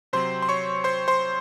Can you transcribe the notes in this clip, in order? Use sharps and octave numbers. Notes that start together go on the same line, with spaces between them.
C3 F#3 C4 C5 C6
C6
C#5 C#6
C5 C6
C5 C6